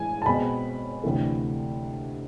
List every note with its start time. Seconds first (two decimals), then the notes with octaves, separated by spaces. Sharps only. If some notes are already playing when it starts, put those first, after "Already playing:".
Already playing: A2 E3 G#3 G#5
0.22 A5
0.26 B2 G#3 C4 B5
1.03 D2 C3 E3 A3